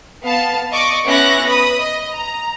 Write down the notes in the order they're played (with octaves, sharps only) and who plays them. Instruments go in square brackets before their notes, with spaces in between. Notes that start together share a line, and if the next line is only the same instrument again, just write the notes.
[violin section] B3 F5 A5
D5 D#5 C#6 D6
B3 C#4 E4 F#6 A#6
B4 B5 D#6
D#5
A#5